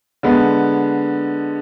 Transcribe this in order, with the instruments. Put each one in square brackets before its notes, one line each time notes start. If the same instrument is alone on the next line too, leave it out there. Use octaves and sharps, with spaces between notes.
[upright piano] D3 G#3 B3